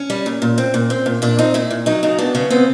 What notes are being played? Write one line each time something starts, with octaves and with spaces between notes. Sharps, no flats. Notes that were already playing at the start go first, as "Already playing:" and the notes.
Already playing: C#4
G3
A#2
A#2
C4
A#2
C4
A#2
A#2 D4
C4 D#4
A#2 E4
A#2
F#3 D#4
C#3 D#4
B3 D4
C#3 C#4
B3 C4